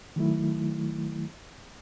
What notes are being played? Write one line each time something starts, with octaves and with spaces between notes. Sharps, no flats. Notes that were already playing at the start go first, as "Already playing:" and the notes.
D#3 F#3 A3 E4